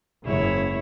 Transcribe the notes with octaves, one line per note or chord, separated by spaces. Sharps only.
F#1 G#2 E4 C#5